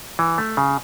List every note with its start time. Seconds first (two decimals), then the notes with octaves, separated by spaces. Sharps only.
0.19 E3
0.38 A3
0.57 C#3